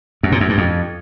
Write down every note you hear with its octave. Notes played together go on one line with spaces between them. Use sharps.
F#2
A#2
F#2
G2
F2